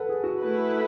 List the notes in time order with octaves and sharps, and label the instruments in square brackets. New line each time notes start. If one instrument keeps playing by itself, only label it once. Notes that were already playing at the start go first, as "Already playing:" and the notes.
Already playing: [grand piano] A4 B4 F#5
G#4
F#4
[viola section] A3 E4 B4